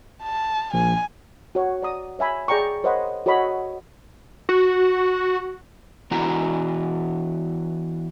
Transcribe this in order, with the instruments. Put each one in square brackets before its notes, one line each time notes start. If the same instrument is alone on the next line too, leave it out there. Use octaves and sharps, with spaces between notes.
[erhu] A5
[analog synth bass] A#1 [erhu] G#5
[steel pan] F#4 C#5
D5 A#5 D#6
C#5 E5 G#5 B5
G#4 D5 G5 A#5 C#6
A#4 C5 C#5 D#5 F#5 B5
F#4 A4 C#5 D#5 B5
[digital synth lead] F#4
[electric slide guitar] E3 B3 E4 F#4 G#5 A#5